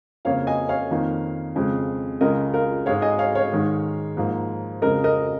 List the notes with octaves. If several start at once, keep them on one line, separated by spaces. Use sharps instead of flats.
F2 C#3 A#3 C#5 F5
D#5 G#5
C#5 F5
F2 D#3 A#3
F2 C#3 G#3
C#2 C#3 G#3 A#4 D#5
F4 A#4
G#2 G#3 C#5 F5
D#5 G#5
C#5 F5
C#5 F5
G#2 D#3 G#3
G#2 F3 A#3
F2 C#3 G#3 A#4 D#5
A#4 D#5